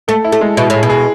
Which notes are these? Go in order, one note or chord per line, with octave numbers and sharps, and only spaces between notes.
A3 A4
E4
A3
G#3
B2 E4
A2 G#4
B2
G#4